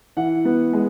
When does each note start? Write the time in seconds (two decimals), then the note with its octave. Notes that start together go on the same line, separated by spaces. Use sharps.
0.17 E3 F#5
0.45 B3
0.73 G#3